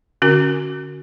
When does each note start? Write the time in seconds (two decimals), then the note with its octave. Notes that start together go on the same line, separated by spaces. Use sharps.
0.22 D3 C#4 F#4 A#4